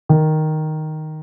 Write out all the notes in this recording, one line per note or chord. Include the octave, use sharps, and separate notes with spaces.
D#3